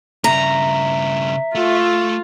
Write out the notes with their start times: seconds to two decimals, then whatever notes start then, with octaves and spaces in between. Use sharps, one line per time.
0.24 G2 C#3 E5 A#5
1.55 A3 F4